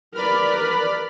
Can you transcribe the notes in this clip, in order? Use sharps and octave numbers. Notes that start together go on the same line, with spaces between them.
A#4 B4 D5 B5 F6